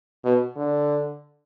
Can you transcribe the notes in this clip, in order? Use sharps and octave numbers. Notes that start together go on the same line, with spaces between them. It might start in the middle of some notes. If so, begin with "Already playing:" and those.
B2
D3